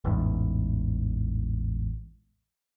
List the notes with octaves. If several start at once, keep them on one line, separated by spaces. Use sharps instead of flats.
A1 E2 G#2